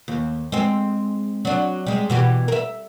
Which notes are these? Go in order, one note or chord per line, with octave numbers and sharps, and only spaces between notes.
D#2
G#3 C4
F#3 D4
G3 G#3
B2 E3 G4
A#4 E5